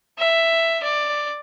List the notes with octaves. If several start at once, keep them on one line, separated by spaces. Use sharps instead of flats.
E5
D5